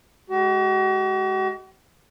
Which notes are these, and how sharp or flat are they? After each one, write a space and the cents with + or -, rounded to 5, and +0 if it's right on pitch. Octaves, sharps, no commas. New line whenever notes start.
G#3 +10 F#4 +45